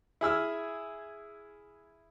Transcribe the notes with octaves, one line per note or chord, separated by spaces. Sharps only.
E4 G#4 E6 F6